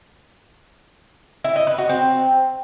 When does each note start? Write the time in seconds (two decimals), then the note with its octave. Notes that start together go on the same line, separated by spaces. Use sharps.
1.44 E4
1.56 D#5
1.67 B4
1.78 F#4
1.89 C4